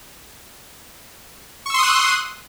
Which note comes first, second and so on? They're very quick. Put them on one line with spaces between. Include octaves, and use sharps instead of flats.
C#6 E6 C6 D#6 F#6